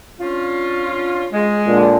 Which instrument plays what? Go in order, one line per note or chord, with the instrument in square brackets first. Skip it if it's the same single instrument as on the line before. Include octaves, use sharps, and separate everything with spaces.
[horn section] C#4 D4 F4
G#3
[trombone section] A#2 D3